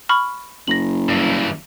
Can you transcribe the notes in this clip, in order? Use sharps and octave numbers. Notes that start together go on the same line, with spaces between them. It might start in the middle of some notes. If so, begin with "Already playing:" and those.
B5 C#6 F6
F#1 A#6 F#7
G2 E3